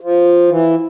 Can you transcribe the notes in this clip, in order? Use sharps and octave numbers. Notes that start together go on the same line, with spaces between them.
F3
E3